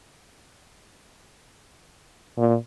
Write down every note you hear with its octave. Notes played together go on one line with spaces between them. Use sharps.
A#2